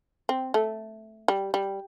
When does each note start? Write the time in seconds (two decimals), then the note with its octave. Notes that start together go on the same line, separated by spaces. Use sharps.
0.29 C4
0.54 A3
1.28 G3
1.54 G3